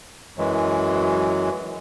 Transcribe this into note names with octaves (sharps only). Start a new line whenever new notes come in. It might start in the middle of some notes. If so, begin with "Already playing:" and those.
F#2 E3 F#3 G#3